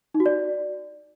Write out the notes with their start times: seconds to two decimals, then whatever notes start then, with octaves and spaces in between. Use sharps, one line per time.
0.14 D#4
0.20 F#4
0.26 D5